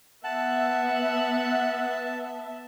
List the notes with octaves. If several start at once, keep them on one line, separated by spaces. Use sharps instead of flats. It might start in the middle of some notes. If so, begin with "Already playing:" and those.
B3 E5 F#5 A5